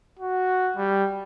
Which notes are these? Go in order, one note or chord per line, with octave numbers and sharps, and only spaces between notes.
F#4
G3